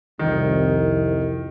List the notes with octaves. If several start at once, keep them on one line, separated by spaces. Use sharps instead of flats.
C2 F2 D#3